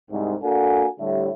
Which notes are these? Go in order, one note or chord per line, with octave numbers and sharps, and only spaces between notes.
C2 G#2
A#3 D4 F#4 A4 F#5 G#5
A2 D3 G3 G4 C#5 E5